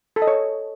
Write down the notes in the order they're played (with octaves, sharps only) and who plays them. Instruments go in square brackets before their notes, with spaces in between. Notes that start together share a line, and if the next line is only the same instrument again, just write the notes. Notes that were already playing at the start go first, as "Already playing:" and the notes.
[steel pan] A4
D#5
C#5